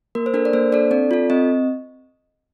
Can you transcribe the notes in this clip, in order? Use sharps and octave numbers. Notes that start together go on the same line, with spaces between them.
A#3 A#4
C5
D4 A4 A#4
D5
A#3 C5
D4 A4 D5
C4 D5
F4 A4
C4 D#5